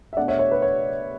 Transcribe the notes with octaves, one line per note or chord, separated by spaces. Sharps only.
E5
B2 A3 D4 D5 F#5
C#5 E5
C#5
B4
C#5